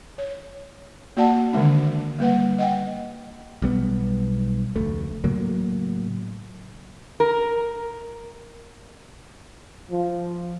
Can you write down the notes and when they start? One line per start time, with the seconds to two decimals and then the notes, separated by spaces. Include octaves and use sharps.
0.18 C#5
1.17 A#3 F#4 D5 F#5 A5
1.53 D3 D#3 G#3 D4
2.19 G3 A#3 B4 F#5
2.58 D#5 F#5 G5
3.62 B1 G3 B3
4.76 F1 D2 A3
5.24 A2 C#3 F#3 A#3
7.20 A#4
9.91 F3